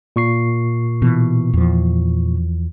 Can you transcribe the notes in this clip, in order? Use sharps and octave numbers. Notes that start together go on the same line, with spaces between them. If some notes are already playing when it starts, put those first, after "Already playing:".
A#2 C#6 C7
B2 E3
E2 F3